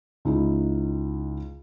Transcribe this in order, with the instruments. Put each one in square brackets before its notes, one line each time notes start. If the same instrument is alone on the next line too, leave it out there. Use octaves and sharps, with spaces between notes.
[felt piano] C#2 D#4 E4